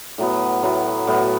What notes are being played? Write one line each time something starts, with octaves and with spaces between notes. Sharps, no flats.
A2 F#3 B3
A2 F#3 B3
A2 F#3 B3